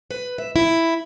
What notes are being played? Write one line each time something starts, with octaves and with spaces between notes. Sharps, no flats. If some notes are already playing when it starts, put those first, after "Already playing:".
B4
E5
E4